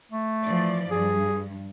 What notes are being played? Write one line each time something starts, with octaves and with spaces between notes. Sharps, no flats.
A3
E3 F3 D5
G2 G#4